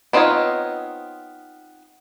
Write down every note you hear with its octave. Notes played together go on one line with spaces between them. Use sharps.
B3 C4 D#4 F4 C#5